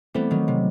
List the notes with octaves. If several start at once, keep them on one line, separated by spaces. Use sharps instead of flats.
E3 G3 A3 B3 C4
D#3 F#3
C3